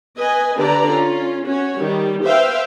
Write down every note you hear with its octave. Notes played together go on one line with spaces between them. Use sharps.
B4 D#5 G#5
D3 G4 B4 D5 A#5
C#4 F4
C#4 F#4 C#5
D#3 G3
B4 C5 E5 F5 G5